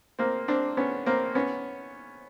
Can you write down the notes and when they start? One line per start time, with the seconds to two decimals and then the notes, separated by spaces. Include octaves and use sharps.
0.19 A#3 C4
0.48 C4 D4
0.77 B3 C#4
1.06 A#3 C4
1.35 B3 C#4